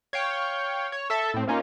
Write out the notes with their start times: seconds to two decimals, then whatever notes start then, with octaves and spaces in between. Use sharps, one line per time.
0.13 C#5 F5 G5
0.92 C#5
1.10 A4 E5 A5
1.34 A2 C4
1.48 A#3 C#4 D#4 F4